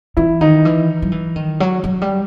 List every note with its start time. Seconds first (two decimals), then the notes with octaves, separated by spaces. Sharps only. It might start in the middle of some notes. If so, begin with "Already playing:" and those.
0.17 E3 E4
0.41 D#3 D#4
0.65 E3
1.02 F#3
1.12 E3
1.36 D#3
1.60 F#3
1.84 F#3
2.02 G3